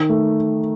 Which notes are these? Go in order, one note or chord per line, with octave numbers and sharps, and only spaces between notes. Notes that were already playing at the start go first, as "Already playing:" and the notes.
Already playing: D#3
A3